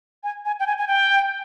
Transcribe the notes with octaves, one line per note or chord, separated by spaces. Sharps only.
G#5
G#5
G5
G#5
G#5
G5